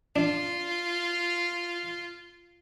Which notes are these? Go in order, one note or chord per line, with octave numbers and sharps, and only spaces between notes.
D4 F4